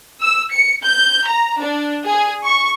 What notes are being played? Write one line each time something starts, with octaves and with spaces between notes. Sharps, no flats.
E6
C#7
G6
A#5
D4
G#4
C#6